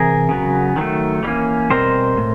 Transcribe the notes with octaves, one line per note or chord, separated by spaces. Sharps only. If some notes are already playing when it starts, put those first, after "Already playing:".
Already playing: C3 E3 G#4 A#4
C#3 F#3 B3
D#3 F#3 A3
E3 G3 A#3 C#4
B2 G3 C4 A#4 C5
A2